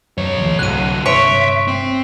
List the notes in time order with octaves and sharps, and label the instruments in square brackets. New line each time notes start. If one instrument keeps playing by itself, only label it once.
[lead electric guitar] B1 C#5 [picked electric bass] F#2
[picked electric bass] G#1 D2 E3
[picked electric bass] C2 [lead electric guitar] D3 F#3 [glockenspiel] F#6 D#7
[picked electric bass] G1 C3 [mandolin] C#5 [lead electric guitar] E5 [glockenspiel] C6 B6 D7
[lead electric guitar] C4